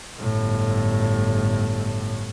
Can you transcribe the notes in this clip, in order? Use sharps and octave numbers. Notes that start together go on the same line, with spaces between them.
G1 A2